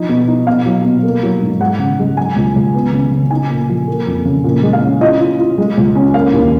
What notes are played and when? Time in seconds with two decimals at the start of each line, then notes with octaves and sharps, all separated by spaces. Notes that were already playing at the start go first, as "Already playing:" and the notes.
Already playing: F3 D#4
0.09 B2
0.27 D#4
0.47 B2 F5
0.66 F#3
0.85 B2
1.03 A#3
1.23 F#3
1.42 G#2
1.60 G#3 F#5
1.79 C#3
1.99 G#3
2.17 F#3 G#5
2.36 C#2
2.56 C#2
2.75 B3
2.92 C#3
3.11 C#3
3.30 D#4 G#5
3.49 A#2
3.69 F3
3.88 A#3
4.07 F2
4.25 C#3
4.44 A#2
4.63 G#3
4.73 F5
4.82 C#4
5.01 F4 D#5
5.21 F4
5.39 F4
5.58 G#3
5.77 C#2
5.95 C#4
6.14 A#3 F5
6.34 D#2